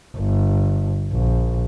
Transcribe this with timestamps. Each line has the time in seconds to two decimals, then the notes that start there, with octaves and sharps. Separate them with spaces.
0.17 G1
1.12 A#1